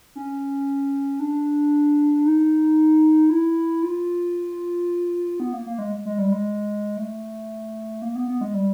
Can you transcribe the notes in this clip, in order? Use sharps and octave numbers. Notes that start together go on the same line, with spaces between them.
C#4
D4
D#4
E4
F4
B3
A#3
A#3
G#3
G#3
G3
G#3
A3
A#3
B3
B3
G#3
G3